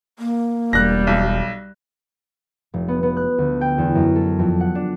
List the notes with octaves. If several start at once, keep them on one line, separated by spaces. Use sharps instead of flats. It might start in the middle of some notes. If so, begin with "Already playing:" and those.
A#3
E1 G3 F#6 A#6
B1
F1
B3
B3
F#6
D2
G5
E2
F#2
A4
F2
F#5
D4